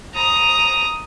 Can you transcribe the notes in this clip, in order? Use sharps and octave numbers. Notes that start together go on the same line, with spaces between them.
A#5 D#6